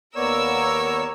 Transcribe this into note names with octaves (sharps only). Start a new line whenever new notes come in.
D#2 B3 A#4 C#5 D5 E6